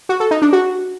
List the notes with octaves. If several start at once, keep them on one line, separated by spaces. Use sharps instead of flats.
F#4
A4
D#4
D4
F#4